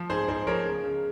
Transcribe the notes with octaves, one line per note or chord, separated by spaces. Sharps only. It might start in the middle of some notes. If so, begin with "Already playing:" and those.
Already playing: F3
G#2 G#4 C5
G#2 G#4 C5
F3 A#4 C#5
C#3
C#3